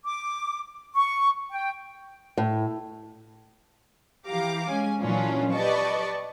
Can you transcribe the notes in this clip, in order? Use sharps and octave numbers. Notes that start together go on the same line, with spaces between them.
D6
C#6
G5
A2
E3 G4 F5 A#5 D6
G#3 C#4 G#5
A#2 E3 F#3 C#4 D4 F4
G4 B4 D5 D#5 A5 C#6